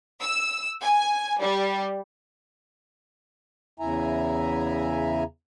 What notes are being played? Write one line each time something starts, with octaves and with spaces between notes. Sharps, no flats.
E6
G#5
G3
E2 C#3 E4 E5 G#5 A#5